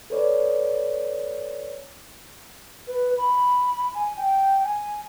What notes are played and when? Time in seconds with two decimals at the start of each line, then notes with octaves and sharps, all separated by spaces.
0.10 A4 B4 C#5 D5
2.87 B4
3.17 B5
3.94 G#5
4.17 G5
4.64 G#5